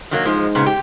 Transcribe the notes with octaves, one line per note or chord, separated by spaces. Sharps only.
D#3 F#3 A#3
G#2 F3 G#3
A#2 C#3 B3
G4